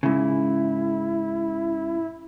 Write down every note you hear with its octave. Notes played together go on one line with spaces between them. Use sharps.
G#2 C#3 E4